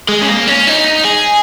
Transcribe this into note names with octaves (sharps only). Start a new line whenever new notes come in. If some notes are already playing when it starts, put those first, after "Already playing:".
G#3
C#4
A#3
C#4
D#4
G#4